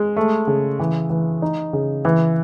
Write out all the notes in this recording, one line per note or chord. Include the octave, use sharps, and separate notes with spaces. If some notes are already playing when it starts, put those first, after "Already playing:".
Already playing: G#3
A3
C#3
E3
E3
D#4
C#3
E3